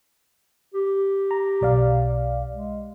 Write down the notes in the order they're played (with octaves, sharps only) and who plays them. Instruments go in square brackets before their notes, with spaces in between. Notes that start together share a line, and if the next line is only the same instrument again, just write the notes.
[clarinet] G4
[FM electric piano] A#5
B1 D5 F5
[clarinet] G#3